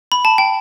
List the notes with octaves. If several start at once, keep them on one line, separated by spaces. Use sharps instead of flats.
B5
A5
G5